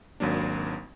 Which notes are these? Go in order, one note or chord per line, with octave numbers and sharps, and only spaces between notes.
G#1 D#2 F#3 A#3 D4